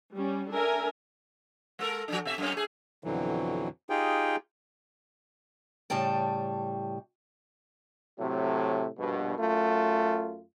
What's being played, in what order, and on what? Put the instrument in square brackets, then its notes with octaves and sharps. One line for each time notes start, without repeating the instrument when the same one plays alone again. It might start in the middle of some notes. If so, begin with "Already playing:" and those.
[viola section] G3 C#4
D4 A4 A#4 E5 G#5
[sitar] G#3 A4 A#4
F3 G3 D4
B2 E5
F#2 A#3 C#4
A3 G#4
[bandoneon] F2 B2 D3 E3 F#3
D#4 F4 G4 G#4 G5
[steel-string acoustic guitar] A2 C#3 G3 G5 A5
[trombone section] A2 C3 F#3 A3
A#1 G2 B2
F#2 A3 F4